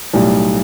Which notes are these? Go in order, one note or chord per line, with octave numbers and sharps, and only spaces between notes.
B1 A2 G3